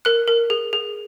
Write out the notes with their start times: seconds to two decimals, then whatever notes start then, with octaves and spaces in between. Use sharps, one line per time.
0.05 A#4 F#6
0.28 A#4
0.50 G#4
0.73 G#4